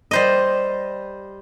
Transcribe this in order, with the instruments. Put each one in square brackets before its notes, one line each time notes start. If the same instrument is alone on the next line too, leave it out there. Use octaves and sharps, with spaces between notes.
[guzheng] G3 C5 D#5